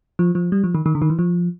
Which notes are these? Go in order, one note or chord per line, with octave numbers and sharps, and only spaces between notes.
F3
F3
G3
F3
D#3
D#3
D3
D#3
E3
F3